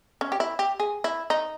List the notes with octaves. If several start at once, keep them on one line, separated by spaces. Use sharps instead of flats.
C#4
G4
E4
G4
G#4
E4
D#4